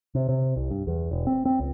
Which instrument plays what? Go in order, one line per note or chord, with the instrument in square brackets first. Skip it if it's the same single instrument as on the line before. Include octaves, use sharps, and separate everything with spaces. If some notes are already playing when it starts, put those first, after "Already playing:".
[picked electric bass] C3
C3
C2
G2
E2
E1
C4
C4
C#2